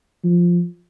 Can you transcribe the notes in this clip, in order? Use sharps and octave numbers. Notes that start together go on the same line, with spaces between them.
F3